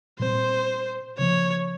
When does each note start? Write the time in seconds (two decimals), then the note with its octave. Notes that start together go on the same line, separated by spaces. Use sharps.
0.19 A#2 G3 C4 C5
1.18 C#3 F3 A#3 C#5